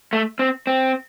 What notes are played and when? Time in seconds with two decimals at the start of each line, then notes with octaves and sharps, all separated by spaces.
0.13 A3
0.39 C4
0.67 C4